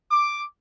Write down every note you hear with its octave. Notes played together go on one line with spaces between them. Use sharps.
D6